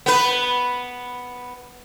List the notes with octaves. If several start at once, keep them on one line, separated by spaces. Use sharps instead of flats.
B3 B4